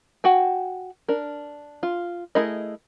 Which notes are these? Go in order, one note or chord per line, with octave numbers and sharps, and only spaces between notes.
F#4 G5 G#5
D4 A#4
F4
A3 E4 G#4 A#4 D#5